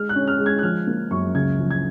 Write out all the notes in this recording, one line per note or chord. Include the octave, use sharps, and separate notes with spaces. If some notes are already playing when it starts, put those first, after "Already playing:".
Already playing: G#3 F6
F#6
C#4
F6
G#3
G#6
F#6
F3 F6
A#3
F#2 C#6
C#2 G#6
F3
G#6